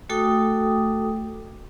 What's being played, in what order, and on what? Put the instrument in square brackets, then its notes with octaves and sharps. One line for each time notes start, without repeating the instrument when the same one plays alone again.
[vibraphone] A3 F#4 A4 G5 D6 D#6